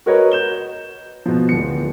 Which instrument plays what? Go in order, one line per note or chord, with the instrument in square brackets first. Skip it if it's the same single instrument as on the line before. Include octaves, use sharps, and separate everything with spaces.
[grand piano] F#4 A#4 B4 C#5 D#5
G6 E7 G7
B2 F3
D1 C#7